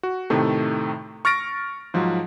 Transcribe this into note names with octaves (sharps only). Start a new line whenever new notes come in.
F#4
A2 C3 D#3 A3
C#6 F6 A6 A#6 D7
G#2 F3 F#3